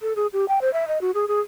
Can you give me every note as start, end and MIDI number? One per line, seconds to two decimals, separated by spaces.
0.01 0.13 69
0.16 0.27 68
0.33 0.45 67
0.48 0.59 79
0.61 0.72 72
0.73 0.87 76
0.88 1.01 75
1.01 1.11 66
1.14 1.28 68
1.28 1.40 68